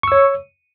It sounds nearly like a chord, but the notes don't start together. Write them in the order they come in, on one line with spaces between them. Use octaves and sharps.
C#6 E6 C#5